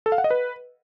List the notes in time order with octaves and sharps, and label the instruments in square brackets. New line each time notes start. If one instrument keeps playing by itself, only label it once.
[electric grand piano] A4
F5
F#5
D#5
B4